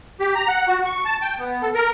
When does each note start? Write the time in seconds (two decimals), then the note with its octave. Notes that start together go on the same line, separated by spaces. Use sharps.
0.20 G4
0.35 A#5
0.48 F#5
0.68 F#4
0.85 C#6
1.05 A5
1.22 G5
1.39 B3
1.62 A4
1.74 A#4